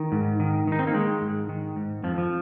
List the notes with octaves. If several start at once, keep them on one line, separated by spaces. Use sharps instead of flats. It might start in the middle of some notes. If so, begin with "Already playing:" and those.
Already playing: D#3
G#2
D#3
D#3 D#4
C4
A#3
D#3 G#3
G#2
D#3
G#2
F2 F3
F3